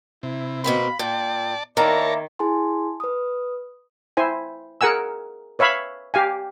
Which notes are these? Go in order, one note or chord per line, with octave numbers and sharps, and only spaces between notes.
C3 E4
B2 A#3 C4 F5 B5
A#2 D5 G5 A5
D#3 A#3 E4 A#4 C#5 D5 A5 A#5
E4 G#4 G#5 A5 C6
B4 D#6
E4 C5 G#5
G#4 A#4 F#5 G#5 E6
B4 C#5 E5 F5 B5
G4 F5 G#5